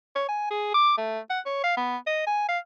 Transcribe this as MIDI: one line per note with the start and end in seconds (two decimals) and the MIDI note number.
0.16 0.25 73
0.28 0.50 80
0.51 0.73 68
0.74 0.95 86
0.98 1.19 57
1.30 1.40 78
1.45 1.60 73
1.64 1.74 77
1.77 1.97 59
2.07 2.25 75
2.27 2.48 80
2.48 2.58 77